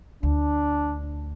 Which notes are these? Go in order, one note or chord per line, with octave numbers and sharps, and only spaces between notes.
D2 D4